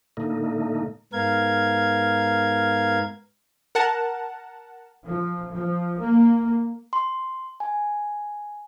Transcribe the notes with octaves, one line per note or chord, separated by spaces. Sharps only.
A2 D3 A3 A#3 D#4
G#2 B3 A#4 F5 G#6
A#4 F#5 A5
F3
F3
A#3
C6
G#5